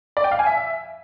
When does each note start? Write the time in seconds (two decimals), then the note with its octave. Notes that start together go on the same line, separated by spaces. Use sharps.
0.17 D5
0.24 G5
0.32 F5
0.39 G#5
0.46 E5